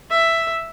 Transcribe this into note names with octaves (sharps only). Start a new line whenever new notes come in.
E5